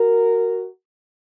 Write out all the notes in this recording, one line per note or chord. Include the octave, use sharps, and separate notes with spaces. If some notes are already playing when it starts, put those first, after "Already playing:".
Already playing: F#4 A#4